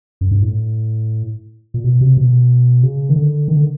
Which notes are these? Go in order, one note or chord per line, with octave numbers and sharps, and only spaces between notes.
F#2
G2
A2
A#2
B2
C3
B2
C#3
D#3
D3
D#3
D3